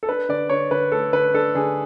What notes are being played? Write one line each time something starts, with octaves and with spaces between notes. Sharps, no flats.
A4
D4 B4
D3 D5
D3 C#5
D3 B4
A3 A4
D3 B4
D4 A4
D3 G#4